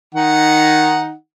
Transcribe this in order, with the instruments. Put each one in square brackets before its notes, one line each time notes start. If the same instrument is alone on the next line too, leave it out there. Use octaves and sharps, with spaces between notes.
[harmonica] D#3 D#4 F#5